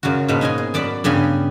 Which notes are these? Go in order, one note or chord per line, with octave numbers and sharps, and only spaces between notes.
F#2 C#3 F#3 F4 F#4
G#2 B2 A#3 B3 B4 F5
C#4 D#4 D#5 G#5
G#4
F#2 D5 F#5 A5 B5
G2 C#3 B3 G4 G#5 A#5